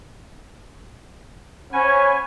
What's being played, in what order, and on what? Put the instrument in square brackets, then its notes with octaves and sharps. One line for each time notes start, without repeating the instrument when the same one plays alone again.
[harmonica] C#4 C#5 [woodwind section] C5 F#5 B5 [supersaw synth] G#5